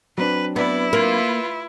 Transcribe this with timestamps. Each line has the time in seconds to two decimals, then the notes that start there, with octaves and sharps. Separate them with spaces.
0.18 F#3 C4 D4 B4
0.56 B3 E4 D5
0.93 A#3 F4 B4